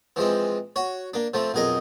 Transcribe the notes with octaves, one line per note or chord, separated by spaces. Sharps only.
E3 F3 G#3 C4
F#4 C#5
A#3 D4
F3 A3 C4
B1 F2 G#4 A#4 D#5